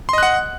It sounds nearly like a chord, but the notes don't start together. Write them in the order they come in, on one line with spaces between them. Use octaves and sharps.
C6 D#5 F#6 F#5